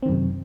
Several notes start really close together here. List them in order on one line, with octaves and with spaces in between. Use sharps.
C4 D#3 F#2 C3